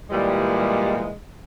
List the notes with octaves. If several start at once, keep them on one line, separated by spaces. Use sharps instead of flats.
A#2 E3 G3 G#3